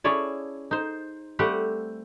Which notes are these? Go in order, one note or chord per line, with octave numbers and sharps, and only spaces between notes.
C#4 E4 G#4 C#5 D5 A5
D#4 C5
G3 A3 C4 G4 F#5